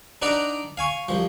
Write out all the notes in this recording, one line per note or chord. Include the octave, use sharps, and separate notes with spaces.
D4 D#4 B4 D5 F#5 A#5
F5 G#5 C#6
C2 F3